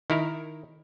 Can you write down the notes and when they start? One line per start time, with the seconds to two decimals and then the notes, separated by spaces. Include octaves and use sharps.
0.10 D#3 E4 A#4